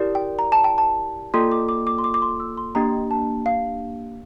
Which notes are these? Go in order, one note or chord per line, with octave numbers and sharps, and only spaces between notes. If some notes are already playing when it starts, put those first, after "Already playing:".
Already playing: E4 G4 A#4 D5
G5
A#5
A5
G5
A5
A#3 F4 A4 D5 G5 C6
D6
D6
D6
C6
D6
D6
C6
E6
C6
A#3 D4 G4 A#5
A5
F5